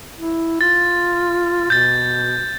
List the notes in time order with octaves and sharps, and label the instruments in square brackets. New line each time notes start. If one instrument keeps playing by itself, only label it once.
[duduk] E4
[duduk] F4 [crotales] A6
[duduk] B2 [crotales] G6 A6